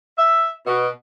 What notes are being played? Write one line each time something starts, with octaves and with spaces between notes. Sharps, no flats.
E5
B2